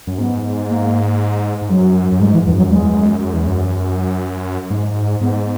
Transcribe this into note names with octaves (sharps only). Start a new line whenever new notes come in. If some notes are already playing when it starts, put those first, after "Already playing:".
F#2
G#2 B3
A#3
G#2
F#2 F#3
F#2
G#2 G#3
E3
E3
E2
F#2 F#3
E2 G#3
F#2
F#2
E2
F#2
G#2
G#2 B3